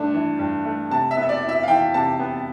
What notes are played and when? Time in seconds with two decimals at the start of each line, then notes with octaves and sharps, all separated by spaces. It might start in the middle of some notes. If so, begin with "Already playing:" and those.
Already playing: G2 A3 D4
0.14 E3
0.39 G2
0.65 A3
0.90 C3 A5
1.11 E5
1.16 B3
1.22 E5
1.29 D5
1.43 E4
1.49 E5
1.63 F5
1.68 E3 G5
1.94 C3 A5
2.19 B3